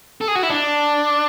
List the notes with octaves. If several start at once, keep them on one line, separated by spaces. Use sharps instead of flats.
A4
G#4
F#4
E4
D4